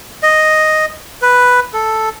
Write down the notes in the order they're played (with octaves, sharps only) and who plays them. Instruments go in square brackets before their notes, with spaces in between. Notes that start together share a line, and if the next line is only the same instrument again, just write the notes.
[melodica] D#5
B4
A4